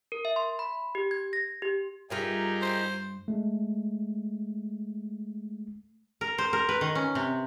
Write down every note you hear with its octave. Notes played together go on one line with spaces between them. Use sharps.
A#4
E5
C6
B5
G4
G#6
A#6
G4
G2 D#4 F4 G4 G#4 A#4 E5
C5
G#3 A3
A#4
C5
A#4
B4
D#3
C#4
C3